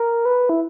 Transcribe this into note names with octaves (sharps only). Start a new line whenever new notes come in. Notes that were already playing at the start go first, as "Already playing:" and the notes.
Already playing: A#4
B4
E4